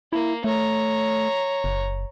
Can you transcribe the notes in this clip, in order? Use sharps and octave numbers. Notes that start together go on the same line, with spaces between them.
A#3 E4
A3 C#5 A#5
F#1